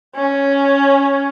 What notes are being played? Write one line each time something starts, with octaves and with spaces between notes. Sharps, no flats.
C#4